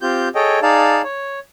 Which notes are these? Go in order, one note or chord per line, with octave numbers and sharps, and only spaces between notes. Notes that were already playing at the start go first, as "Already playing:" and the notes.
C4 F4 G4 G6
G#4 A4 C#5 D#5 G5
D#4 G#4 D5 F5 A5
C#5